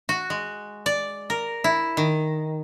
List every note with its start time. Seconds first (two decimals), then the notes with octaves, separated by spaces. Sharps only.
0.09 F#4
0.30 G#3
0.86 D5
1.30 A#4
1.64 E4
1.97 D#3